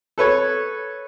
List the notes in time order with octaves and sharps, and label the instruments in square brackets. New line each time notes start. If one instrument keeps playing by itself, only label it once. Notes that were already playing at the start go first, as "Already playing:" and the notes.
[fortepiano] A4 B4 C#5